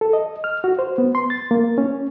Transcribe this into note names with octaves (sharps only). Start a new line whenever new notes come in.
A4
D#5
F6
F#4
C5
B3
C6
A6
A#3
C#4